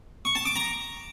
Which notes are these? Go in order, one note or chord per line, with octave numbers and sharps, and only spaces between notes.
C#6
A5
D6
A#5